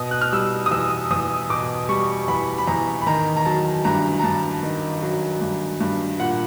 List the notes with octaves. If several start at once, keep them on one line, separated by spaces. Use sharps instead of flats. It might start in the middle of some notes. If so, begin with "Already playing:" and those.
Already playing: B2 D#6
F#6
F6
G3 E6
D#6
E2 E6
E2 D#6
B2 D6
G3 C#6
E2 B5
B5
E2 A#5
B5
D#3 A#5
A#5
F#3 A5
G2 A#5
A#5
G2 A5
D#3
F#3
G2
G2
A#2 F#5